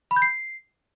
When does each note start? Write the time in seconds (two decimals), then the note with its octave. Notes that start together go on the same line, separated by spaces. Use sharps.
0.11 B5
0.16 G6
0.22 C7